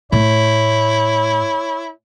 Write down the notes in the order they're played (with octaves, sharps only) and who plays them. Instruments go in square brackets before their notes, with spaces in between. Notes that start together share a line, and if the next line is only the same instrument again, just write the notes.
[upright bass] A2 [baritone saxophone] E4 [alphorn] C#5